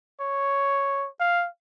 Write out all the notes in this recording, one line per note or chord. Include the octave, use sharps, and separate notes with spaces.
C#5
F5